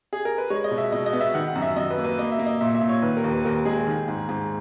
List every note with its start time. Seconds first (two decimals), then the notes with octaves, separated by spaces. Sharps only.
0.13 G#4
0.25 A#4
0.38 B4
0.50 G#3 C#5
0.64 D#5
0.71 B2
0.78 E5
0.92 B2 D#5
1.06 D#5
1.13 B3
1.21 E5
1.34 D#3 F#5
1.48 F#5
1.56 F#2
1.62 E5
1.76 F#2 D#5
1.90 B4
1.98 A#3
2.04 B4
2.18 A#3 D#5
2.32 E5
2.39 A#3
2.46 D#5
2.61 A#2 E5
2.75 E5
2.81 A#2
2.89 C#5
3.02 D#3 B4
3.17 A#4
3.24 D#2
3.31 B4
3.45 D#2 A#4
3.65 G#3 G#4
3.87 D#3
4.08 G#2
4.29 G#2